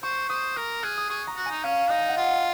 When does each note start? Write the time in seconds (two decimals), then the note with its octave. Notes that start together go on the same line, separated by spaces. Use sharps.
0.03 C5 C#6
0.29 C5 D#6
0.56 A#4 F6
0.83 G#4 F#6
0.98 D#6
1.09 G#4 C#6
1.27 A#5
1.36 F#4
1.46 D#4 G#5
1.64 C#4 F5
1.90 D#4 D#5
2.01 G#5
2.09 F#5
2.16 F4 F5